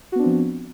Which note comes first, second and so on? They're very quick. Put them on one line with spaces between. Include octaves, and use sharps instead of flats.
F#4 B3 D4 C4 F3